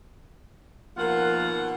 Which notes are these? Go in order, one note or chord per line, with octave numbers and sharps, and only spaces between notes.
D#2 B2 F3 A#3 F4 A#4 F#5